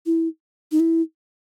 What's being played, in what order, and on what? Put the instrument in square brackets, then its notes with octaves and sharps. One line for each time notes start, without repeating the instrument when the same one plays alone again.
[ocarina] E4
D#4
E4